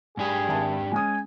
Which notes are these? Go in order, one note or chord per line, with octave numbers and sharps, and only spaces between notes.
G#2 D4 G4 G#4
G#1 E5 A5
G#3 C#4 G#5 D#6